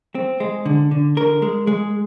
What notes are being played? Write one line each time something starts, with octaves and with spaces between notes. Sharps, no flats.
C4
G#3
D3
D3
D3 A#4
G#3
G#3